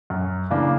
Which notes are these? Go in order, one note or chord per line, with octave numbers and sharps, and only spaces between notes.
F#2
C#3 E3 A#3 D4